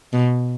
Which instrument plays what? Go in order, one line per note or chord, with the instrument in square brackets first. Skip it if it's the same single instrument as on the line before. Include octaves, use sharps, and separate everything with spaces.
[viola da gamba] B2